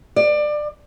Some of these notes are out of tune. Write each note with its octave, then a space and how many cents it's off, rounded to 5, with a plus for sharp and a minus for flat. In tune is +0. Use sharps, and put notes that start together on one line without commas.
D5 +25